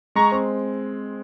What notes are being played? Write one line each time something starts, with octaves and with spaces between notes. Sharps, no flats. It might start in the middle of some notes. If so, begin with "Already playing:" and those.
G#3 A#5 C#6
C4